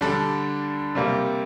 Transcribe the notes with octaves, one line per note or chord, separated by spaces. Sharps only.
D3 G3 D4 A4
C3 G3 A#3